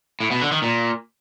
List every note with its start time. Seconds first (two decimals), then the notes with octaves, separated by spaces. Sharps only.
0.20 A2
0.31 B2
0.41 D3
0.52 D#3
0.62 A#2